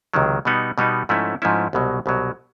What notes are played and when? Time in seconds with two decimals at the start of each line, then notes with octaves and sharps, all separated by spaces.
0.14 C#2 C3 D#3 F#3
0.45 B2 G3 B3 D#4
0.78 B2 G3 B3 D#4
1.09 G#2 F3 A3 C#4 E4
1.42 G#2 F3 A3 C#4 E4
1.73 C2 B2 F#3
2.06 C2 B2 F#3